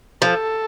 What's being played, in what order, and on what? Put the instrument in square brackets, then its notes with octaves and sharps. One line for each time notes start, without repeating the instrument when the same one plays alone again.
[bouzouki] F3 [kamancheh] A4